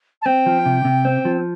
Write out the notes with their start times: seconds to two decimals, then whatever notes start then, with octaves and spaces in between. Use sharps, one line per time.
0.22 A5
0.26 C4 G5
0.46 F3
0.66 C3
0.85 C3
1.05 C4
1.25 F3